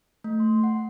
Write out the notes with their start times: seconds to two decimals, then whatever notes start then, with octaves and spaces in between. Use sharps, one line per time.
0.24 A3
0.40 C6
0.64 F#5